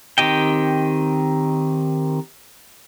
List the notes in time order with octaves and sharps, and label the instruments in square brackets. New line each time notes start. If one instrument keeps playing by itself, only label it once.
[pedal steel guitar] D#3 C4 G4 D#5 G5